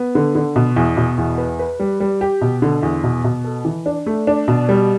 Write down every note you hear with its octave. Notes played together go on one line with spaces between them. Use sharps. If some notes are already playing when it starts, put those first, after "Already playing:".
Already playing: B3
D3
D3
B2
E2
B2
E2
B4
B4
G3
G3
G4
B2
D3
E2
B2
B2
A4
E3
D4
A3
D4
B2
G3